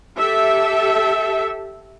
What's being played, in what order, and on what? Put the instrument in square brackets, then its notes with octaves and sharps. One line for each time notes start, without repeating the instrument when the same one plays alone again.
[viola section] G4 A4 E5